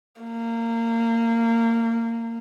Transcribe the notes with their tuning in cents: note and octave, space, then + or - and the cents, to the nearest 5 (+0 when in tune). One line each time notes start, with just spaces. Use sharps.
A#3 -25